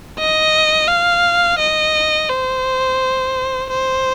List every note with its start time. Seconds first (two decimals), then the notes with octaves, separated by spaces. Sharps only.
0.19 D#5
0.88 F5
1.59 D#5
2.30 C5
3.70 C5